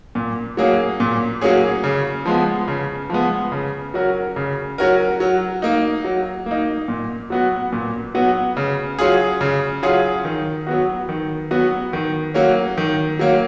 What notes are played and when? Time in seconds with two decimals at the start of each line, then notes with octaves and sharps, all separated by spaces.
0.15 A#2
0.57 F#3 A#3 C#4 G#4
1.00 A#2
1.41 F#3 A#3 C#4 G#4
1.84 C#3
2.26 F3 G#3 B3
2.68 C#3
3.10 F3 G#3 B3
3.52 C#3
3.94 F#3 C#4 F#4 A#4
4.36 C#3
4.78 F#3 C#4 F#4 A#4
5.20 F#3
5.62 A#3 D#4
6.05 F#3
6.46 A#3 D#4
6.88 A#2
7.30 F#3 B3 F#4
7.72 A#2
8.15 F#3 B3 F#4
8.57 C#3
8.99 F#3 C#4 F4 G#4
9.41 C#3
9.83 F#3 C#4 F4 G#4
10.25 D#3
10.67 F#3 B3 F#4
11.09 D#3
11.51 F#3 B3 F#4
11.93 D#3
12.34 F#3 A#3 C#4
12.77 D#3
13.19 F#3 A#3 C#4